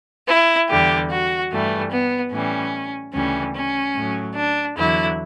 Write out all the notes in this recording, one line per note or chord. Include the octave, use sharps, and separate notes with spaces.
E4
E2 D3 G3 G4
F#4
G2 E3 G3 A3
B3
A2 E3 G3 C#4
D2 C#3 E3 G3 C#4
C#4
A2 F#3
D4
E2 D3 F#3 E4